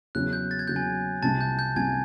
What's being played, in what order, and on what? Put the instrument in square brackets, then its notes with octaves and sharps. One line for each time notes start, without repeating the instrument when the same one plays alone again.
[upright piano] E2 C#3 F#3 [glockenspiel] F#6
[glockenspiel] G6
A6
G#6
[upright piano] E2 C#3 F#3 [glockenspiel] G6
[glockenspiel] G#5 G#6
[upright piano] C2 C3 F3 [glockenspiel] A5 A6
[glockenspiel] G6
G6
[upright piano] C2 C3 F3 [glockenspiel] G#5 G#6